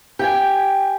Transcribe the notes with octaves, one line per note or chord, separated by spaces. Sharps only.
G4 G5 G#5